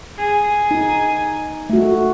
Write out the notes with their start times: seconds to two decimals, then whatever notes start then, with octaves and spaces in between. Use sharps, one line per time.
0.17 G#4
0.71 D#4
1.70 A3 F#4